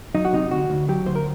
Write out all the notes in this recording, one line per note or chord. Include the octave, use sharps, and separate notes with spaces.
F#3 D#4
F#4
C3 D#4
D2 F#4
D2
F#3 G4
D2 C5
A#4